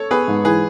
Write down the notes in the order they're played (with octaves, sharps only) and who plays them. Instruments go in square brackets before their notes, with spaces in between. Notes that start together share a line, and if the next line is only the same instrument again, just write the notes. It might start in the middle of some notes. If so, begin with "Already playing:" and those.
Already playing: [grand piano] A4 C#5
[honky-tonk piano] B3 [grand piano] G#4 B4
[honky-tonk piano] G#2
[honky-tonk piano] E3 [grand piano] G#4 B4